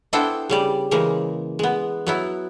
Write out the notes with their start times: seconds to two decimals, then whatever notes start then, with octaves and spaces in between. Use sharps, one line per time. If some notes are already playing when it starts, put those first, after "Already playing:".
0.13 B3 D4 E4 A4 C5 G5
0.49 C#3 G3 D5
0.91 C#3 E3 G#3 A#3
1.59 G#3 B3
2.07 F#3 B3 E4